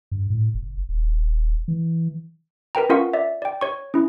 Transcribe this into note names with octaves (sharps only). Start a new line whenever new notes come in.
G2
A2
F#1
D#1
E3
A#4 B4 G5 A#5
C#4 F4 A#4 F5 F#5 C#6
D5 E5
D5 G5
C#5 C#6
C#4 E4